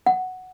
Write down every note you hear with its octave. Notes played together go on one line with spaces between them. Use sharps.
F#5